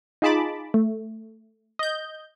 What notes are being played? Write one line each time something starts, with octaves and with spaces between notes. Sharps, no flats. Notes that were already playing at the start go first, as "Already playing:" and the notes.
D#4 F4 G#4 A5 B5 D6
A3
D#5 G6